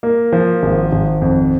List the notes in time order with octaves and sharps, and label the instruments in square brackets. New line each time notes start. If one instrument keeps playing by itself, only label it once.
[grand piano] A#3
F3
G#1
G#1
F2